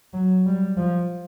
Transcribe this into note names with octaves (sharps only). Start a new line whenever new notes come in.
F#3
G3
F3